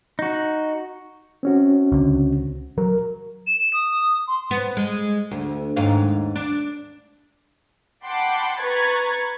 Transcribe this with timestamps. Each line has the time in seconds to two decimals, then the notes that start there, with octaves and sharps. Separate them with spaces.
0.19 D#4 F#4
1.43 C4 C#4 F#4
1.92 C#2 D3
2.78 F#3 A#4
3.47 E7
3.73 D#6
4.27 C6
4.51 B3
4.77 G#3
5.31 D2
5.76 D#2 G#2 F5
6.35 D4
8.04 F#5 G5 A5 B5 C6 D6
8.60 B4 A#5 C#6 G#6 A6